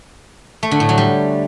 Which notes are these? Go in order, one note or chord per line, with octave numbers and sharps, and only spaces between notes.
A3
D3
A2
F#3
G3